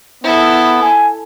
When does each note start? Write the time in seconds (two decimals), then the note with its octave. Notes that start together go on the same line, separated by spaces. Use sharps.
0.24 B3 E4 A4
0.82 G#5